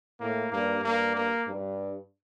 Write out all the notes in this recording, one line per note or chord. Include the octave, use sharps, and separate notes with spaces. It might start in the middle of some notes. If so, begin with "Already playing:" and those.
A2 A#3
G2 A#3
G2 A#3
A#3
G2